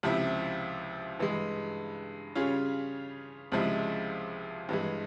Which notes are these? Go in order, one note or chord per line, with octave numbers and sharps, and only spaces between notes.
C#2 C3 F3 C4 E4
G2 E3 G#3
C#3 G3 C#4 F4 G#4
C#2 C3 F3 G#3 E4
G2 E3 G#3